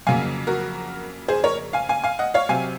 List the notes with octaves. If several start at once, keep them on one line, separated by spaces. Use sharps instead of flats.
F2 C#3 F#3 A#3 F5 G#5
F#4 A#4
G#4 C5
A#4 C#5
F5 G#5
F5 G#5
F5 G#5
D#5 F#5
C#5 F5
C3 F#3 C4 F5 G#5